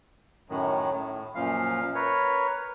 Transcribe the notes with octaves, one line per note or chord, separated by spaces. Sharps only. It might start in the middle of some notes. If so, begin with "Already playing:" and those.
F#2 A2 D#3 F#3
A2
F#2 A#2 F3 F5
A#4 B4 C#5